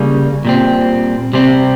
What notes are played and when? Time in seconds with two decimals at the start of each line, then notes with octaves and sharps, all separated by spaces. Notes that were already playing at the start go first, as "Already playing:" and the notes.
Already playing: C#3 G3 A#3 C#4
0.45 A#2 G3 C4
1.33 C3 G3 C4